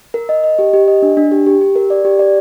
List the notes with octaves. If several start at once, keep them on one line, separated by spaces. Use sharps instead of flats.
A#4
D#5
D#5
G4
G4
D#5
D4
D4
G4
G4
G4
A#4
D5
G4
D5